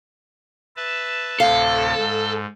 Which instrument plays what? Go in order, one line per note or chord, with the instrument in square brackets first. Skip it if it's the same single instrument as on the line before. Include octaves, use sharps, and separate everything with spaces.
[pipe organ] B4 E5 A5
[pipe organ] D2 A2 C3 [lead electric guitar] A4 [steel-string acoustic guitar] F5
[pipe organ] G#2